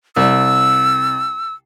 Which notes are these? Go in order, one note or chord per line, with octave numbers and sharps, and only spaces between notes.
C2 E6